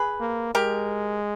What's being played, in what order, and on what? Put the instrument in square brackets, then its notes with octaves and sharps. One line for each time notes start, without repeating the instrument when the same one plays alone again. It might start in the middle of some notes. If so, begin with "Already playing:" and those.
Already playing: [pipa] G#4 B4
[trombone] A#3
[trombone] G#3 [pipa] G4 A#4